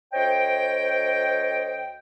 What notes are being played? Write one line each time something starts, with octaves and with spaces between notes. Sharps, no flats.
D2 C5 C#5 D#5 G5